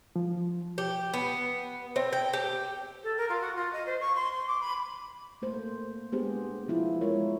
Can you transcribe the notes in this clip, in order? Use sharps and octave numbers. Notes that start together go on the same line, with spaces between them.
F3
G4
B3
C4
G5
G4
A4
A#4
F4
F#4
F4
D#5
C5
C#6
C6
C6
D6
B5
A3 A#3 C5
G#3 B3 D4 G4 G#4 C5
F3 E4 F4
G#3 F4 A#4 C#5